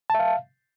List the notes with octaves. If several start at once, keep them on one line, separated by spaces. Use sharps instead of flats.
E5 F5 A5